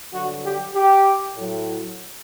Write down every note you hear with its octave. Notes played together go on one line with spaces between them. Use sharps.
G2 D3 F#3 F#4
G4
G4
A2 F#3